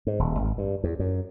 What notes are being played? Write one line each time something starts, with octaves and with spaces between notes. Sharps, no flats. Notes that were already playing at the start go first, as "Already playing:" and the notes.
G#2
D#1
G#1
G2
E2
F#2